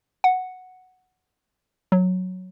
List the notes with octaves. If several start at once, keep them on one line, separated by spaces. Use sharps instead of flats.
F#5
F#3